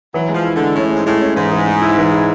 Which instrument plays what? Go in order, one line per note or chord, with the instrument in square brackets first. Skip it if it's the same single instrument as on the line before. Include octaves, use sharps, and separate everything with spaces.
[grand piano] E3 [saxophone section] F#3
[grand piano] G#3
[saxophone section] F3
[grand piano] E4
[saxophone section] D3 [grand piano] G#3
[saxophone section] A2 [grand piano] C#4
[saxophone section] G#2 [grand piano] G#3
[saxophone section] A2 [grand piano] G#3
[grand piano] C#4
[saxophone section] G#2 [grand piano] E3
[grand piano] E3
G#3
E4
E3
E4